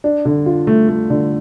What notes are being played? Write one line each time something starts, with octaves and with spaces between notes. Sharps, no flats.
D4
D3
F4
A3
A3
D3